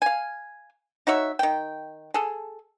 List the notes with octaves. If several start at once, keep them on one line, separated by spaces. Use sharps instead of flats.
F5 G#5
D#4 F#4 C#5 E5
D#3 G5
G#4 A4